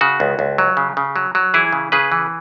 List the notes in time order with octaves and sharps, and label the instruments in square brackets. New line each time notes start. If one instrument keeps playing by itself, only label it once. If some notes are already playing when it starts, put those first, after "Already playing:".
[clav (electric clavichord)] C#3 F#4
C#2
C#2
F#3
C#3
C#3
F#3
F#3
E3 E4 G#4
C#3
C#3 G#4 B4
E3